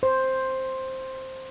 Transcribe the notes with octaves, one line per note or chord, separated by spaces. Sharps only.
C5